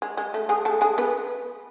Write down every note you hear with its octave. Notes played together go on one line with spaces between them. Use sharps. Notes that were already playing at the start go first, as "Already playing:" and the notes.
G#3
G#3
A3
G#3 G#4
A3 A4
G#3 G#4
B3 B4